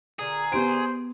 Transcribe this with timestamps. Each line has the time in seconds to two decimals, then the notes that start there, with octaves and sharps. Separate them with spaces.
0.19 A#2 D3 G#4 A#5
0.52 B3 G4 C5 D7